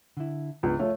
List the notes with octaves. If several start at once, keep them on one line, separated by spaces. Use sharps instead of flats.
D3 E4
C#2 B3 D4
A3 F4 C#5